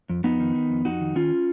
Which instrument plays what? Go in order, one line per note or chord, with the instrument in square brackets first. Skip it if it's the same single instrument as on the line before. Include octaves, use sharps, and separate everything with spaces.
[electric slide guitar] F2
F2 B3 D#4
D#3
D#3
F2
F2 D#4 F#4
D#3
D#3 C#4 F4